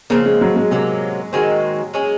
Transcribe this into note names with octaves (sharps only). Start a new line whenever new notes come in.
C#3 F3 A#3 C4
G#3
F#3
G#3
C3 F#3 G#3 A#3
D#3 G#3 C4 F#4
G#3 C#4 G#4